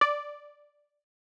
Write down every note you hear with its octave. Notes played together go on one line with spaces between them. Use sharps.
D5